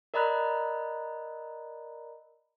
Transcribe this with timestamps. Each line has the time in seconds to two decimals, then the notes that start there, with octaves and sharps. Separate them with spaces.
0.14 A#4 D5 D#5 A#5 B5 F#6